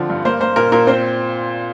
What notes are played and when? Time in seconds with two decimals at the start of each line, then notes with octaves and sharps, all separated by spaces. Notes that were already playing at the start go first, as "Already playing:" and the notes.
Already playing: D3 F3 C4
0.10 G2
0.25 A#3 C5
0.41 A#3 C5
0.56 A#2 A#4
0.72 A#2 A#4
0.87 C4 C5